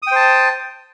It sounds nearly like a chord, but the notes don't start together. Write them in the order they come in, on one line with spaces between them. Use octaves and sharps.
D#6 G5 C5 A5